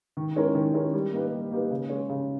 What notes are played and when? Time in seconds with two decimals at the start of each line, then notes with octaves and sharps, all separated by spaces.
0.17 D#3
0.36 G#3 C#4 E4 A#4
0.55 D#3
0.74 G#3 C#4 E4 A#4
0.93 G3
1.13 A#3 D#4 G4 B4
1.32 G3
1.51 A#3 D#4 G4 B4
1.71 C#3
1.89 G#3 C#4
2.09 C#3